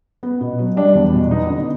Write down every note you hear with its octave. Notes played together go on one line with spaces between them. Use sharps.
B3
B2
F#3
G3 D4
E2
B2
B3 D#4
D3